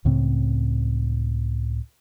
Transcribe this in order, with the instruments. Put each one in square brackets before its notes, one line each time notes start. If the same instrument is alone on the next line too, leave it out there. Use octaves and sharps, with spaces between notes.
[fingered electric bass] C#2 A2 C#3 C4